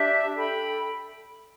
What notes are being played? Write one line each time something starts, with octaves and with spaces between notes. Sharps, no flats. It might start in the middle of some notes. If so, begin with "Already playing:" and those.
Already playing: D4 G4 E5
A4 G5 B5